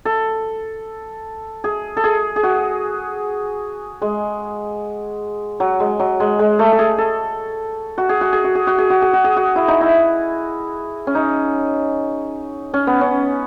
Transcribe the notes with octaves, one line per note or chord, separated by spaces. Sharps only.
A4
G#4
A4
G#4
G#4
F#4
G#3
F#3
G#3
F#3
G#3
G#3
A3
A4
G#4
A4
F#4
G#4
F#4
G#4
F#4
G#4
F#4
G#4
F#4
G#4
F#4
G#4
F#4
E4
D#4
E4
C#4
D#4
C#4
B3
C#4